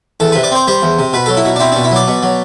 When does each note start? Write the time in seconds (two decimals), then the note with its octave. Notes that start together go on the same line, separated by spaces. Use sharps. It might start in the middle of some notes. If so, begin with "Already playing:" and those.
0.20 E2 A4
0.32 C3 B4
0.44 D5
0.51 C4 C5
0.67 G3 C5
0.82 E2
0.99 C3
1.13 B2 B4
1.26 F#3 A4
1.37 E4
1.45 B2
1.56 D4
1.60 C4 E4
1.72 B2 D4
1.84 E4
1.91 F#3 D5
2.08 B2
2.23 F#3